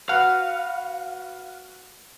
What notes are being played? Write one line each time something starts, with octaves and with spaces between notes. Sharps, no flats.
F#4 B4 F5 F#5